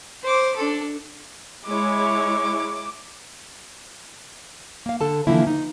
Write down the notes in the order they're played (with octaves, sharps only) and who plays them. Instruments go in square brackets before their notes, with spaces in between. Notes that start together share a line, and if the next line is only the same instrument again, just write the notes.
[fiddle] C5 D6
D4 A4
[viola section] G#3 E4 C#5 [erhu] D6
[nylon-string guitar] A#3 F5
D3 A4 A5
D3 E3 F3 A#3 E4
D#4